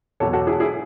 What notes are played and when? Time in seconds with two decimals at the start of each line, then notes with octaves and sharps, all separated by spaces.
0.20 E2 B2 F#3 A4 C#5
0.33 F#4 A4
0.47 E4 G#4
0.60 E4 G#4